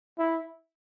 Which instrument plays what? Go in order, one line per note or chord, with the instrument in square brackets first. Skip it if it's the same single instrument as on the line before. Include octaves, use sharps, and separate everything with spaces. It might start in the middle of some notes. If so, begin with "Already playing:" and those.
[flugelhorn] E4